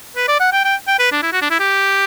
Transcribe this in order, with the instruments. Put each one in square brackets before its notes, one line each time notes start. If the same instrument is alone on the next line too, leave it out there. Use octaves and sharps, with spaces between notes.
[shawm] B4
D5
F#5
G5
G5
G5
B4
D4
E4
F#4
D4
E4
G4